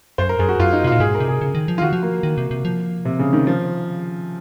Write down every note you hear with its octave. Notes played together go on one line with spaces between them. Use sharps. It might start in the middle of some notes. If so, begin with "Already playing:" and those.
F#2 C5
A#4
F#2 G#4
F#4
F#2 F4
D#4
C3 F4
A#2
G#2 G#4
A#4
C3
G#4
C#3
D#3
F3
F4
D#3 F#4
F3
A#3
D#3
C3
C3
F3
C3
C#3
D#3
F3